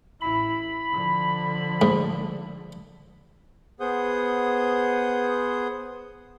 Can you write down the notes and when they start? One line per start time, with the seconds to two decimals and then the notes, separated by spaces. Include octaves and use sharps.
0.21 A1 E4 B5
0.92 D3 F3
1.82 G#2
3.80 B3 G#4 C5 F#5 D#6 G6